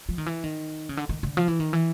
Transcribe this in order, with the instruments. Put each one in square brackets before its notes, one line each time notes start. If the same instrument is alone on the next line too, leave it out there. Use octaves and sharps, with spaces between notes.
[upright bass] F3
D#3
E3
D#3
C#3
D3
D#3
D3
F3
E3
D#3
E3